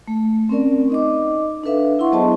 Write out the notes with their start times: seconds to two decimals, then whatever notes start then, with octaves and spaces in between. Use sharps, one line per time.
0.08 A3
0.49 C4 C#4 A#4 D5
0.90 D#4 D#5 D6
1.64 D4 A4 B4 E5 F5
1.99 E4 F#5 C6 C#6
2.12 F#3 B3 G#4 C5 D#5 A5